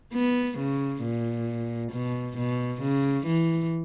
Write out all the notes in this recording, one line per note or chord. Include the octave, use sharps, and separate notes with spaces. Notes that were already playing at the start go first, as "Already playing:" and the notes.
B3
C#3
A#2
B2
B2
C#3
E3